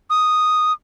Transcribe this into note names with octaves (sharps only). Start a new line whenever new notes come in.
D#6